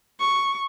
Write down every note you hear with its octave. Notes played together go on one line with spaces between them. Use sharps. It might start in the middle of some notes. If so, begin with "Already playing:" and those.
C#6